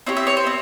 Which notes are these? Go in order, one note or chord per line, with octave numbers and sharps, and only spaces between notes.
C4 E4 G4 C#5
E5
C#5
C5
C4